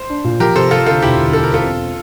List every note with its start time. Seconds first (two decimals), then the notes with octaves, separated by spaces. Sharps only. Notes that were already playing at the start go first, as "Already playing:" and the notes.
Already playing: C5
0.09 D4
0.24 A#2
0.40 F3 G4 A#4
0.56 C3 A4 C5
0.71 C3 F4 A4
0.86 D2 F4 A4
1.02 E1 E4 G4
1.18 D2
1.33 E1 A4
1.43 E1 A#4
1.54 F4 A4
1.64 C4